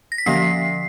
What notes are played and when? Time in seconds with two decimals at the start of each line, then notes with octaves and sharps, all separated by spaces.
0.12 A#6
0.18 B6
0.26 D3 F3 A#3 C#4 C7